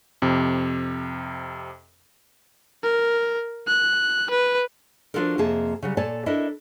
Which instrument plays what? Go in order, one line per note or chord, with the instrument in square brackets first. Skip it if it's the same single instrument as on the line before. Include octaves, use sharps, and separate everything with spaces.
[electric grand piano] F2 C3
[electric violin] A#4
F#6
B4
[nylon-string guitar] F3 D4 F4 F#4 A4 A#4
F2 C3 A#3 G#4 A5
C#3 F#3 G3
A#2 A4 C#5 D5 G#5 A5
D4 E4 A4 A#4 D#5